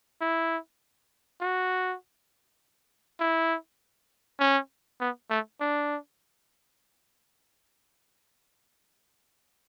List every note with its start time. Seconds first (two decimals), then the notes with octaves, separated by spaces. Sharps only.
0.21 E4
1.41 F#4
3.20 E4
4.40 C#4
5.01 B3
5.30 A3
5.61 D4